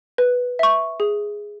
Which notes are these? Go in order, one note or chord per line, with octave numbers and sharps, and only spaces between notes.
B4
E5 C#6
G#4